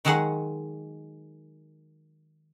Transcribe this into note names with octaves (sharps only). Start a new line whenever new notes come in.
D#3 F#3 G#3 G#4 F#5